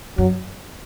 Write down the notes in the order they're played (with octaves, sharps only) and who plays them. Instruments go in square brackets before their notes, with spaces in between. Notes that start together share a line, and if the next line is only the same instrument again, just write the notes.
[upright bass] F#2 [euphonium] F#3